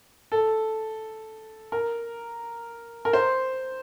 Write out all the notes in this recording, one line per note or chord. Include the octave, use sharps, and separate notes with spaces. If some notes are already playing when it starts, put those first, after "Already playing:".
A4
A#4
A#4
C5